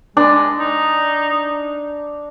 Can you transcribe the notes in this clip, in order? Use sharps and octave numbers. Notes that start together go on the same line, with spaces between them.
G#3 D4
D#4